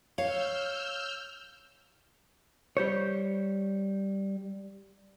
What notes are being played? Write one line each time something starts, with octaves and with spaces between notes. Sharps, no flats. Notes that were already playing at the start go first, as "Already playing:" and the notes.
C#5 F5 E6 F6 G6
G3 C5 C#5